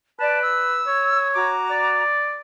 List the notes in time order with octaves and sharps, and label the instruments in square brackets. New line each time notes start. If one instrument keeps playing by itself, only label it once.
[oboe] B4 [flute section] D5 A5
[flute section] E6
[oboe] C#5
[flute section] F#4 A#5 D6
[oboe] D5